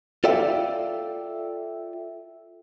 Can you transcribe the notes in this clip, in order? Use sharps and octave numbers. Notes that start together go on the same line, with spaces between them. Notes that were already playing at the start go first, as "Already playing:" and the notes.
F4 A4 D5 E5 F5 G5